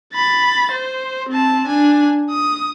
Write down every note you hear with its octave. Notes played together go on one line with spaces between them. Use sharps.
B5 A6
C5
C4 A5
D4 G#5
D#6